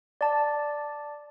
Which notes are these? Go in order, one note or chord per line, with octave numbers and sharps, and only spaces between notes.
D5 A5